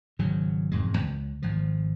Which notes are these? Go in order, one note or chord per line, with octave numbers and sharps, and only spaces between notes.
G#1 C#3 F#3
E1 F2 G#2 G#3
C#2
G#1 F3